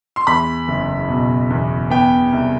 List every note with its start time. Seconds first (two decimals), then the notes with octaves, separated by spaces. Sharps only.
0.16 C6
0.27 E2 B5
0.68 F#1
1.08 B2
1.50 E2
1.90 B3 G5
2.32 C2